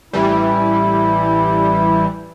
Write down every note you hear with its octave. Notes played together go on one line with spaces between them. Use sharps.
A1 E3 G3 E4